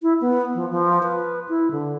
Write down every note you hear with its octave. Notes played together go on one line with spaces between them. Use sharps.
E4
B3
F3
F3
B4
E4
D3